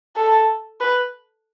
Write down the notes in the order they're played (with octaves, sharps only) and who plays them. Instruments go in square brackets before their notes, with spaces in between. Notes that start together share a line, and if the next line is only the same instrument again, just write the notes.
[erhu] A4
B4